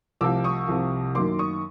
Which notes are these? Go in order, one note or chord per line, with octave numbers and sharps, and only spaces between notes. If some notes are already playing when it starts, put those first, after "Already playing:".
C2 C3 F3 D6 E6
C#6 D#6
C2 C3 F3
F#2 D#3 F#3 A#3 C6 D6
C#6 D#6